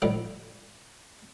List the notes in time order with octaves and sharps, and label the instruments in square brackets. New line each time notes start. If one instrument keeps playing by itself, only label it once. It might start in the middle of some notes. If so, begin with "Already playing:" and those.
[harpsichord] A2 D3 D#3 F3 G3